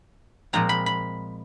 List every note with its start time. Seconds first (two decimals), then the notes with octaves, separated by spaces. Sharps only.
0.53 A#2 F3 G#3 C4 A#5
0.69 B5
0.86 B5